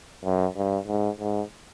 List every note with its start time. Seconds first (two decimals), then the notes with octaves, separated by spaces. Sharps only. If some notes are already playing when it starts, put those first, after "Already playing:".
0.24 F#2
0.56 G2
0.87 G#2
1.19 G#2